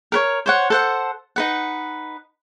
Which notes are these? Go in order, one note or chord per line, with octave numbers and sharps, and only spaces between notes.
A#4 B4 C#5
C5 C#5 F#5
A4 C5 F#5
D#4 B4 F#5